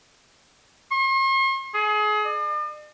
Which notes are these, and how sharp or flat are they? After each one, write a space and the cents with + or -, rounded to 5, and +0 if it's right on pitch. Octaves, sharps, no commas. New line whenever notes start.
C6 +45
G#4 +30
D5 +45